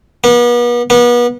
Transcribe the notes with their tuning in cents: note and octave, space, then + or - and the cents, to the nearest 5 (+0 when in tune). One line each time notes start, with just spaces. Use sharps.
B3 -40
B3 -35